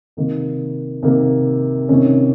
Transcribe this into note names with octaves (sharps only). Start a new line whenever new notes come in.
C3 D#3 A#3
C3 D#3 A#3
C3 D#3 A#3 C#4